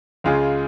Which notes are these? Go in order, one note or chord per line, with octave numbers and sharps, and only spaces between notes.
C#2 C#3 G#3 F4 G#4